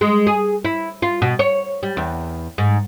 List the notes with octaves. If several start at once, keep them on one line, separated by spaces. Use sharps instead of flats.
G#3
G#4
E4
F4
B2
C#5
G3
E2
G#2